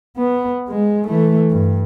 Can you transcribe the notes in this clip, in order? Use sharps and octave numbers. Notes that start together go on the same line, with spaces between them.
B3
G#3
E3 A3
G2